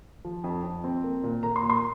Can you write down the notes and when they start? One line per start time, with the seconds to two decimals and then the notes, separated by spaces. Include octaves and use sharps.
0.25 F3
0.44 F2
0.64 F2
0.84 C4
1.04 A#3
1.23 A#2
1.43 A#3 A#5
1.56 C6
1.62 A#2
1.70 C6